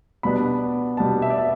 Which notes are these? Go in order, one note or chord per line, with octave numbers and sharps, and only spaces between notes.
B2 G3 B3 D4 B5
B2 G3 B3 D4 A5
E5
D5
E5